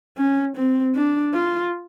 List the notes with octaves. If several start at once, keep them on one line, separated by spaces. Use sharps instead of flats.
C#4
C4
D4
F4